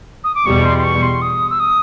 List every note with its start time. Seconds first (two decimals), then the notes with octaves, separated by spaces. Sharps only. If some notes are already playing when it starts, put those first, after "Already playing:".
0.24 D#6
0.35 D6
0.46 E2 B2 G3 C#6
0.65 C6
0.78 C6
0.84 C#6
1.02 C6
1.21 D#6
1.50 E6
1.60 D#6